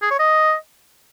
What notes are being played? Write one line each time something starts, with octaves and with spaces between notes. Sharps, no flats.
G#4
C#5
D#5